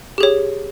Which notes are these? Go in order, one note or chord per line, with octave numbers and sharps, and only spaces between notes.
G4 G#4 C#5